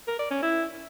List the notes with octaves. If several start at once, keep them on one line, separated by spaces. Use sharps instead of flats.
A#4
D5
C#4
E4